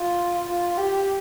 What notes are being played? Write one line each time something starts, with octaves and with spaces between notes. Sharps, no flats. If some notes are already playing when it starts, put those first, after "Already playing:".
Already playing: F4
F4
G4